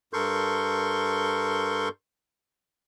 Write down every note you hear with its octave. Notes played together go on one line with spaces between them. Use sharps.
G2 A4 A#4 C6 C#6 G6